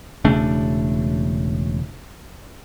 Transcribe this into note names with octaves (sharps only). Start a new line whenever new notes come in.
E1 C#3 A3 D4